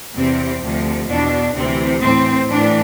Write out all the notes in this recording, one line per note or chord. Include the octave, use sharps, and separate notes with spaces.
E2 C3 E3 C4
D2 C3 F3
E2 B2 D4
D2 C3 E3 C4
A2 E3 C4
A2 E3 D4